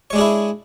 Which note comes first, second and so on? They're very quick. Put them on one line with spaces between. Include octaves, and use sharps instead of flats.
C#5 G#3 D4 G#4 E4